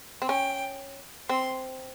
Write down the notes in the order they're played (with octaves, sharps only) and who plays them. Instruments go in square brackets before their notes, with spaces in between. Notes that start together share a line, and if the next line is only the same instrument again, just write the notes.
[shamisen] C4
[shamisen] C#4 [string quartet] G5
[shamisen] C4 [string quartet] C6